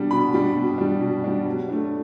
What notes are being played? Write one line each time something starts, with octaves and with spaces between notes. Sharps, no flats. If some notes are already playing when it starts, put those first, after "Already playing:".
Already playing: B2 G3 D4
B2 B5
G3 D4
B2
G3 D4
B2
G3 D4
F#3
A3 D4